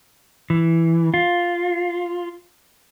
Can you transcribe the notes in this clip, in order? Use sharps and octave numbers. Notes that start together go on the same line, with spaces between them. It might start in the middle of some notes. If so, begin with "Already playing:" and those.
E3
F4